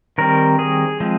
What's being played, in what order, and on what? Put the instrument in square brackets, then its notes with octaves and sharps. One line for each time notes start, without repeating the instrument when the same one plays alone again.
[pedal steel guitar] D#3 G3 C4 A#4
G#4
F3 G#3 C4